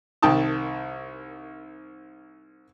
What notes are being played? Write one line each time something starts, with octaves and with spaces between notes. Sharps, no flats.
C2 D#3 G5 A5 D#6